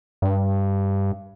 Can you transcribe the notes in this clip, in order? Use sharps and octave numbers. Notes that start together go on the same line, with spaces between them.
G2